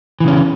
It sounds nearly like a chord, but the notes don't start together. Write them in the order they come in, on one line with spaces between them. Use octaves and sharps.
E3 C#3 C#4